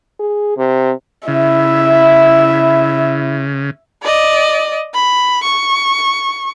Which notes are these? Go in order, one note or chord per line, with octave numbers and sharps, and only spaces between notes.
G#4
C3
C#3 E4 E5
D5 D#5
B5
C#6